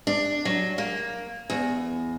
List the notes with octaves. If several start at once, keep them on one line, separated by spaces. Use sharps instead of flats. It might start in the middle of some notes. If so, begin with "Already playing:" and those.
D4
F#3
A#3
E2